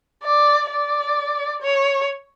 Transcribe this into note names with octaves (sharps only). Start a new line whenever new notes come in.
D5
D5
C#5